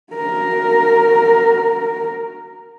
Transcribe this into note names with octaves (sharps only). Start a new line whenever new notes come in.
F#4 A#4